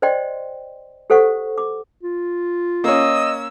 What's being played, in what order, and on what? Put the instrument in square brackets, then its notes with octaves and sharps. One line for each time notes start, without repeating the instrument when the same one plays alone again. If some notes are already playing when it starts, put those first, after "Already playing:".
[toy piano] C5 D5 D#5 G5 C6
G4 A4 C5 F#5 C#6
D6
[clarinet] F4
[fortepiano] A#3 C#4 [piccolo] D#5 [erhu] E6